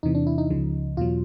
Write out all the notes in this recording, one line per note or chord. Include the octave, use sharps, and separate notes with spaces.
E2 C3 E3 D#4
D4
E4
D#4
C#2 C#3 F3
E2 B2 F#3 F4